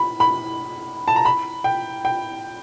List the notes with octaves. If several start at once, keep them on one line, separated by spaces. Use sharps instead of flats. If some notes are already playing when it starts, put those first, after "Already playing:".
Already playing: B5
B5
A5
A#5
B5
G5
G5